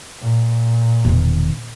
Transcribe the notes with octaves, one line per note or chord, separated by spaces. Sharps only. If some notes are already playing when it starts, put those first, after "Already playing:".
A#2
E1 D#3